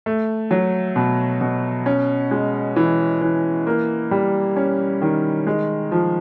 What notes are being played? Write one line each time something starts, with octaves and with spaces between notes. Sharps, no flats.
A3
F#3
B2
B2
C#4
G#3
E3
E3
A#3
G3
C#4
D#3
G#3
F3